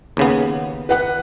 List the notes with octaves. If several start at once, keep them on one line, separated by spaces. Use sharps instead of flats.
D#2 C#3 B3
B4 F#5 F#6